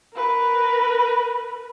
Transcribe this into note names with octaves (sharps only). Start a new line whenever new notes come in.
A#4 B4